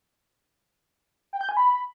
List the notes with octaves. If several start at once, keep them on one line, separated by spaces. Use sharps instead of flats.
G5
G6
G#5
B5